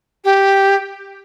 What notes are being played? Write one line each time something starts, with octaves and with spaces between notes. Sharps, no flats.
G4